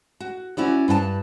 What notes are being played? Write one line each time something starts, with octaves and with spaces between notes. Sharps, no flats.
F#4
C#4 E4 F#4 D5
G2 B4 G5 A5